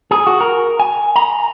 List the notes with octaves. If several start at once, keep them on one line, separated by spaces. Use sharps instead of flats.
G#4
F#4
A#4
G#5
A#5